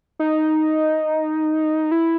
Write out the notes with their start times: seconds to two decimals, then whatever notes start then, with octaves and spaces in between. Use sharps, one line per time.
0.19 D#4
1.91 E4